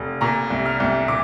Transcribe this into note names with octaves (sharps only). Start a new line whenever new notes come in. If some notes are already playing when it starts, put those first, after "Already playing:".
Already playing: F1
A#2 A#5
C2
F6
C2
A#2 D6